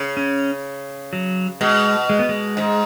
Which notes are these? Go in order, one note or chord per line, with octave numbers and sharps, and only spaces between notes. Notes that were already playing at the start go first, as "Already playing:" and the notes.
Already playing: C#3
C#4
F#3
B2 G#3
G#3
B3
G#3
G#2